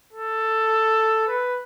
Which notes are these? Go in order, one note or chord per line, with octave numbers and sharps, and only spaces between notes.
A4
B4